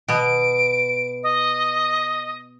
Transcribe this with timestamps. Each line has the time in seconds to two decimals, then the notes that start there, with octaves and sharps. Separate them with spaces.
0.08 B2 B3 D7
1.23 D#5